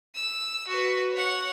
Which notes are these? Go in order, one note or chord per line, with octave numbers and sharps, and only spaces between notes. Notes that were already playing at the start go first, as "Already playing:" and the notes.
E6
F#4 B4
C#5 F#5